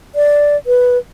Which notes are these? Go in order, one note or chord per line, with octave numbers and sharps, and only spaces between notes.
D5
B4